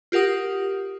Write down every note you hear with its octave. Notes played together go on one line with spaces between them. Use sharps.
F4 G4 A#4 F#5 D#6